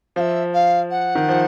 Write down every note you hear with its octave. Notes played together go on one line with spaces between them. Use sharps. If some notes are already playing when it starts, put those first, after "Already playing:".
F3 E5 F5
F5
F#5
D#3
F3